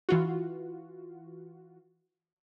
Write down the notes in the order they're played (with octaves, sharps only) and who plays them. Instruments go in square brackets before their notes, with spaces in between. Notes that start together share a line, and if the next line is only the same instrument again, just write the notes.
[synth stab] E3 F4 F#4